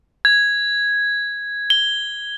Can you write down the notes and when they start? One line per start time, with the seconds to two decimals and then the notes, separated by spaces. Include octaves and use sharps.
0.25 G#6
1.70 G7